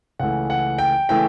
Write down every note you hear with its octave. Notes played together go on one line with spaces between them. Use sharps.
C#2 C#3 E3 A3 F#5
F#5
G5
C#3 E3 A3 G5